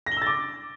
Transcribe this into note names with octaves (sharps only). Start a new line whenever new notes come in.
A#6
G7
E6
A6
D6